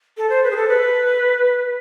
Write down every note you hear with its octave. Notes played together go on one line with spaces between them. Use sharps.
A4
C5
B4
G#4
A4
B4